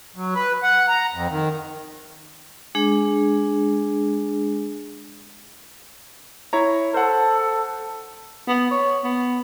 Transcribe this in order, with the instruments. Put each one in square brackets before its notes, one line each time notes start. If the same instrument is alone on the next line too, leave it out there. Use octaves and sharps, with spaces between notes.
[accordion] F#3
B4
F#5
A#5
F2
D#3
[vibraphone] G#3 D4 G#4
[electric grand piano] E4 C#5 A#5
[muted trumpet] A4 [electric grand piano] C5 F#5
[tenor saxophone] B3
C#5
B3